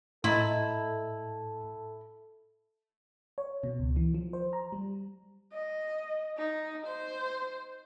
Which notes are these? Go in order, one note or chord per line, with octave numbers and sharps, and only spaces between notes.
A2 E4 A4 D#5 A#5 C6
C#5
B2
C#2
E3
F3
C5
A#5
G3
D#5
D#4
C5